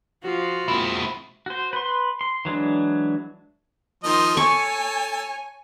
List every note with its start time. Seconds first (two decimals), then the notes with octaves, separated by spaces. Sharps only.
0.23 F3 F4 F#4
0.68 A#2 G#3 C4 E4
1.46 F#4 C5
1.73 B4 C6
2.21 C6
2.45 E3 F#3 G#3 D4
4.04 D#3 F3 D#5 C6
4.37 A4 C#5 G#5 C#6